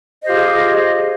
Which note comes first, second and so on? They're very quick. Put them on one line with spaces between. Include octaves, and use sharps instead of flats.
D#5 C5 G4 F4 G#4